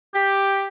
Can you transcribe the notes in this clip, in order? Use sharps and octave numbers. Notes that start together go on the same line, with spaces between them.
G4